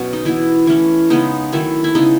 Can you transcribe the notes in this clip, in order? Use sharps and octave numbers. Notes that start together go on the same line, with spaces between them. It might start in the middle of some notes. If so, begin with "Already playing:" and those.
Already playing: B2 F#3 C#4
D#4
E3 B3 E4
E3 A3 C#4
C#3 G#3 B3 D#4
D#3 F#3 A3 E4
E4
C#3 G#3 B3 D#4